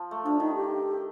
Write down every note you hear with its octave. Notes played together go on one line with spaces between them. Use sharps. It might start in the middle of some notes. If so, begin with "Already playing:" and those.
Already playing: F3
A3
F3 D4
D#3 D#4
G4